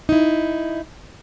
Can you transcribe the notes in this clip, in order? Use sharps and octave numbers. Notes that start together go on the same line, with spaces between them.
D#4 E4